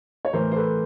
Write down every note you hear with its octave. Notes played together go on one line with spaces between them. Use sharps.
C#5
A2 E3 A#4 C5
C5
A4 B4